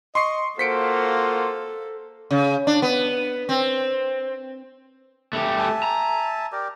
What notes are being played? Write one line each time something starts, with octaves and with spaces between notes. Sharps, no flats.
D#5 C6 C#6 C7
A#3 F4 F#4 A4 C5 B6 C#7 D7
C#3
D4
B3
C4
A3 G4
E5 G#5 A5
A#5
G4 A#4 D5